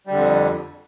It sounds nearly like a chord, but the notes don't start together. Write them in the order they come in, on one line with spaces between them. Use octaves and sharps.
G3 D3 F2